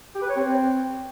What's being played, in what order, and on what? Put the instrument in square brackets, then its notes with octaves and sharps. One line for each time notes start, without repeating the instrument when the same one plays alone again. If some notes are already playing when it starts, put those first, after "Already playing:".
[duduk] G4
B4
C#5
C4